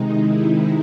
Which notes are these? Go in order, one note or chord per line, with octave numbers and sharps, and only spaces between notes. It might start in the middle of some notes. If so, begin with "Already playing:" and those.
Already playing: C3 D#3 G#3 D#4
E4